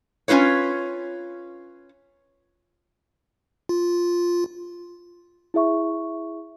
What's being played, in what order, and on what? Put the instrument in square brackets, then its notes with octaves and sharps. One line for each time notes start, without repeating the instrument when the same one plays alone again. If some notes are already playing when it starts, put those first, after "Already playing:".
[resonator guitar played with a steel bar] C#4 D#4 F4 B4 C#5
[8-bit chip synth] F4
[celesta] E4 G#4 E5 C#6